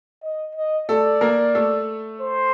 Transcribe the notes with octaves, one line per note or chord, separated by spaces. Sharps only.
D#5
D#5
A3 A4 D5
A#3 A#4
A3 A4
C5